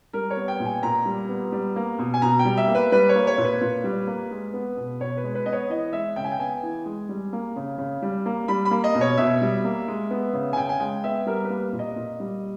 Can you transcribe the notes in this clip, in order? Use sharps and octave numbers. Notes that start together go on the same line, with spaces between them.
G3 A#4
C#5
B3
G5
A#2
G#5
A#2 A#5
G3
B3
G3
A#3
B2
G#5
B2 A#5
G5
G3
E5
A#3
B4
G3 B4
C#5
A#3
C#5
A#2
B4
A#2
G3
A#3
G#3
B3
B2
B2 C#5
B4
G#3
B4
B3 D#5
C#5
E3 D#5
G#3 E5
C#3 G5
G#5
G5
B3 G#5
E3
G#3
G3
A#3
C#3
C#3
G3
A#3
G3 B5
B5
A#3
D#5
B2
C#5
B2 E5
G3
A#3
G#3
B3
C#3
G#5
C#3 G5
G#5
G#3 G5
B3 E5
G3 A#4
B4
A#3
A#2
D#5
A#2
G3